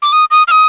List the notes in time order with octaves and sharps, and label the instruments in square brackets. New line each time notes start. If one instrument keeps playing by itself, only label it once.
[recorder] D6
D#6
D#6
F6
D#6